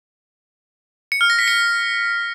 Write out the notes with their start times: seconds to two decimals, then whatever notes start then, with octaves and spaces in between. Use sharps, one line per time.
1.12 C#7
1.21 F6
1.30 A#6
1.39 B6
1.48 C#7